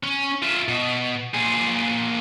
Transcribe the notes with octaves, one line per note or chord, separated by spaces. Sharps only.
C#4
F4 E5
B2
A#2 G#4